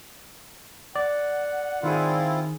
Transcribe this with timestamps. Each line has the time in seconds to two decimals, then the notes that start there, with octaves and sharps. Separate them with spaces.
0.96 D5 F#5
1.83 D#3 C4 E4 F4 G#4